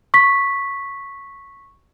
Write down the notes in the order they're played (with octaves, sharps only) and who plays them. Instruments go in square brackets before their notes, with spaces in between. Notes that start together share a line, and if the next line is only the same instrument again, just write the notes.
[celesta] C#6 B6